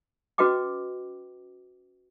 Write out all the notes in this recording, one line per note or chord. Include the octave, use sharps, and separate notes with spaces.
C#4 F#4 B4 D#5 G5 D6